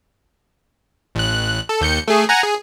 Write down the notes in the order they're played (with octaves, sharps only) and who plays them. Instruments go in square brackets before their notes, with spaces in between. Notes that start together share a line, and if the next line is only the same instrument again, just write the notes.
[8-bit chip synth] A1 F#6
A4
D#2 G6 C#7
A3 G#4
F#5 G#5 A#5
G#4